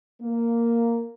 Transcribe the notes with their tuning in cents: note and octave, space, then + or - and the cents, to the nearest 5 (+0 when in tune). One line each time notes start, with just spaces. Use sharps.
A#3 -5